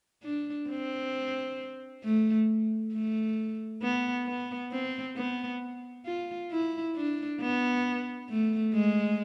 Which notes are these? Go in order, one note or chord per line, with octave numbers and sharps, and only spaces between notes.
D4
C4
A3
A3
B3
B3
C4
B3
F4
E4
D4
B3
A3
G#3